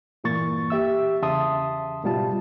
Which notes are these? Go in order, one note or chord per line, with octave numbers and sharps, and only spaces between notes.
G2 A#2 E3 A#3 C#6 A6
G4 E5 E6
E2 C#3 E5 A5 C6 D#6
G#2 B2 G3 F4 A5